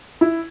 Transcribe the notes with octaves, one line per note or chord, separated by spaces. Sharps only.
E4